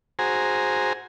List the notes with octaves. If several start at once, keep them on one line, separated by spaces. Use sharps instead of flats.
F#4 G#4 C5 G#5 A#5